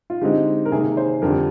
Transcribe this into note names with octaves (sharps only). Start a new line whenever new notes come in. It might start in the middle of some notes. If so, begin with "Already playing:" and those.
F4
D3 G#3 C4 D#4 G4
A#4
C3 D#3 A#3 G#4
C5
F2 D3 G3 A#4